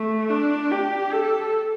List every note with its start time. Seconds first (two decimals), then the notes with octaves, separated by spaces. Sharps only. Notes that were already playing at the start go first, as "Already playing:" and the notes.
Already playing: A3
0.29 D4
0.72 G4
1.13 A4